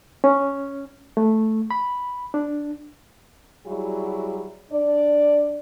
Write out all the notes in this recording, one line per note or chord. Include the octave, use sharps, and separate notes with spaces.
C#4
A3
B5
D4
F#3 G3 E4 F#4 G#4
D4 D5